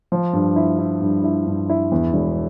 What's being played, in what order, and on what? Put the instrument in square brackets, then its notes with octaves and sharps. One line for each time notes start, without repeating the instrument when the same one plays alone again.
[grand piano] F3
G2
E4
E4
G2
E4
G2
E4
E2
E1